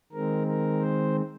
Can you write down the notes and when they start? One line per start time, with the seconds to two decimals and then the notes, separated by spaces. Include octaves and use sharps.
0.12 D#3 G#3 C4 A#4
0.47 A#4
0.80 C5